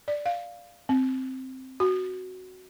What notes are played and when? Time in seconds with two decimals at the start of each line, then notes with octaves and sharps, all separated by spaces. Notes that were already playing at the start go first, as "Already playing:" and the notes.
0.08 D5
0.26 F5
0.89 C4
1.80 F#4